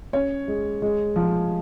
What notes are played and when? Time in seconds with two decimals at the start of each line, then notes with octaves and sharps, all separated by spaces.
0.13 C#4 C#5
0.48 G#3
0.82 G#3
1.16 F3